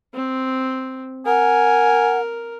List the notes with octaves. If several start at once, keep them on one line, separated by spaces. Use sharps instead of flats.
C4
A#4 F#5 G#5